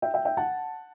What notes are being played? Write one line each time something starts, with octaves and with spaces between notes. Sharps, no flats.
E5 G5
E5 G5
E5 G5
F#5 A5